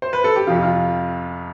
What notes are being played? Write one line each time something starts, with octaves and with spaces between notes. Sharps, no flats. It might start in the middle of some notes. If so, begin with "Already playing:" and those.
C5
B4
A4
G4
F2 C3 F3 F4
F4